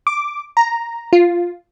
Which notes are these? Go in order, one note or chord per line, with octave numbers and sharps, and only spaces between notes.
D6
A#5
F4